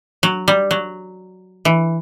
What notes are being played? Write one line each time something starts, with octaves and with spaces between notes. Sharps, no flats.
F#3
G3
F#3
E3